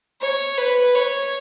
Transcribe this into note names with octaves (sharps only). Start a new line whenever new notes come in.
C#5
B4
C#5